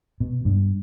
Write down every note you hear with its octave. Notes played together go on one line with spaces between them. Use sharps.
B2
G2